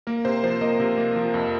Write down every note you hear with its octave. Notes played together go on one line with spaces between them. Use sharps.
A#3 A#4
C3 C5
F3 C5
A#3 A#4 D#5
C3
A#3
F3
F2